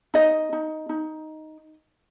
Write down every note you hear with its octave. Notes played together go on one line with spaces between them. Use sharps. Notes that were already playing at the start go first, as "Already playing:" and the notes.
D#4 D#5
D#4
D#4